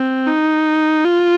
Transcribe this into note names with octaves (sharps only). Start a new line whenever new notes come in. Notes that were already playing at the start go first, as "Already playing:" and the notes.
Already playing: C4
D#4
F4